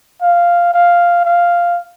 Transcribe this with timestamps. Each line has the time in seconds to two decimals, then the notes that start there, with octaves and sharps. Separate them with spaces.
0.22 F5
0.74 F5
1.25 F5